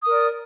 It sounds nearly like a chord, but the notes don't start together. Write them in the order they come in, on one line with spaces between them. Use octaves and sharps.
D#6 A#4 D5